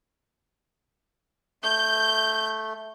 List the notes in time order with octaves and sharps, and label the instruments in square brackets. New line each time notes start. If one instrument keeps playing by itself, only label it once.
[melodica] A3 [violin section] G6